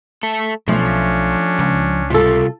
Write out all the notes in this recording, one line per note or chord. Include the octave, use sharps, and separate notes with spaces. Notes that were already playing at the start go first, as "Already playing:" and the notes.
A3 A4
B1 F3 A3 C#4 D4
C#2
C3 G3 F4 A4